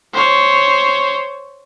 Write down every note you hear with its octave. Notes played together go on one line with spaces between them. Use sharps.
C5 C#5